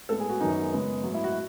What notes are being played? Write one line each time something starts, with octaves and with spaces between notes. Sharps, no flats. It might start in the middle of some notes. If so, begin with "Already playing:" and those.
A2 G#3 B3 A4
G#4
F#4
F#2 D#3 F#3 B3 D#4
C#3 G#3 B3
G#2 F#3 A3
E4
F#4